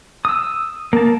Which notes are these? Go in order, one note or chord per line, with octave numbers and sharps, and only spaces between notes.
D#6 E6
A#3 A5